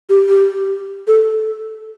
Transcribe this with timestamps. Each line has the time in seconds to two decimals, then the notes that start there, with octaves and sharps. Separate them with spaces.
0.10 G4
0.29 G4
1.07 A4